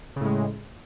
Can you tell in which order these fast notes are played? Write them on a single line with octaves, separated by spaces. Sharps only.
C#3 A2 G#3